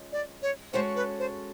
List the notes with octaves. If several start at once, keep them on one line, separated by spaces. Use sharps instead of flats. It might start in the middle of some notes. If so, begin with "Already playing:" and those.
Already playing: G#3 C#4 F4
D5
C#5
G#3 C#4 F#4 A4 C5 C#5
B4
C5